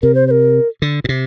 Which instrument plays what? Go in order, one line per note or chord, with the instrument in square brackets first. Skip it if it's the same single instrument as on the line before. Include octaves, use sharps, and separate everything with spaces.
[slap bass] C3 [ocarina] A#4
[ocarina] C5
C5
A#4
[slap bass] D3
A#2
C3